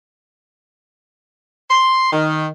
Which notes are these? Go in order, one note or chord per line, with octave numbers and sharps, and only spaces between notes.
C6
D#3